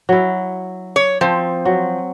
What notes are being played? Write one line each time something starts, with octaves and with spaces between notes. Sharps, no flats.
F#3 E4
C#5
F3 C4
F#3